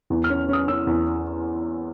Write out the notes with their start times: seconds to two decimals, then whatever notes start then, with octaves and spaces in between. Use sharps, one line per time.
0.10 E2
0.24 F6
0.30 C#4
0.48 C#4 D#6
0.68 C#4 E6
0.87 E2